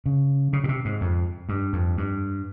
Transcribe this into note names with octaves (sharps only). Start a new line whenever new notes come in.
C#3
C#3
A#2
C3
G#2
F2
G2
F2
G2